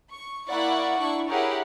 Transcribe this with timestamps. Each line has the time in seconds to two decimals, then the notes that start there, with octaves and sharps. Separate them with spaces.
0.12 C#6
0.48 A#3 E4 D5 F#5 C#6
0.99 D4 E4 C#6
1.29 E4 G4 G#4 A#4 C#5 F#5